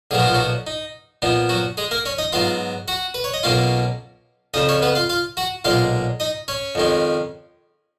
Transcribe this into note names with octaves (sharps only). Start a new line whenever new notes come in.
B1 A#2 F3 B3 G#4
F#4
F4
F#3 F#4
D#4
A#2 F3 B3 D#4
F#3 F#4
G#3 G#4
A#3 A#4
C#4 C#5
D#4 D#5
G#2 F#3 B3 F4 F5
F#4 F#5
B4
C#5
D#5
B1 B2 A#3 C#4 F4 F5
F2 C#3 F3 D#4 D#5
C#4 C#5
B3 B4
F4 F5
F4 F5
F#4 F#5
B1 A#2 G#3 F4 F5
D#4 D#5
C#4 C#5
F2 D#3 G#3 C#4